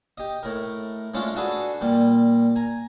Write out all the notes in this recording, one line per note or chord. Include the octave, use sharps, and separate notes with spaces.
G4 D#5
A2 A#4
G#3 A3 C#4 D4 F4
D4 F#4 G#4 A4 B4
A#2 G3
G#5 A#5